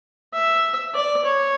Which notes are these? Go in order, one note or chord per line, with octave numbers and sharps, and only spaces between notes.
E5
D5
C#5